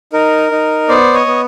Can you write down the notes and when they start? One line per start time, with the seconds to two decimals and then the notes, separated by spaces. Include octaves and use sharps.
0.13 D#4 A#4
0.51 D#4
0.88 B3 C5 D5
1.14 C#5 D#5
1.26 B3